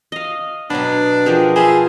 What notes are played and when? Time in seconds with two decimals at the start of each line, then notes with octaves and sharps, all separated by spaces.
0.12 D#5 F5
0.70 B2 F#3 B3 D4
1.26 F3 G4 G#4 A#4
1.56 B3 G#4 C5 E5 F5 A5